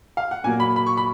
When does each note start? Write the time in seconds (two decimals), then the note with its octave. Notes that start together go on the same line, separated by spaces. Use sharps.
0.17 F5
0.31 F#5
0.44 A#2 F#3 A#3 G#5
0.60 B5
0.76 B5
0.87 C#6
0.97 B5